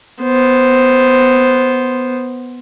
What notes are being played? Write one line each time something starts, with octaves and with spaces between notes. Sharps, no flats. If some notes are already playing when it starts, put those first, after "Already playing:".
B3 C5